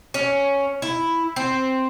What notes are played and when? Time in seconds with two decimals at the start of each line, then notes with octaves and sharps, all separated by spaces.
0.14 C#4
0.82 E4
1.36 C4